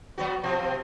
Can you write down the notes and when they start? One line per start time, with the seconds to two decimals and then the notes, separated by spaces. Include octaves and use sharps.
0.18 F#3 B3 F#4
0.44 B2 F3 C4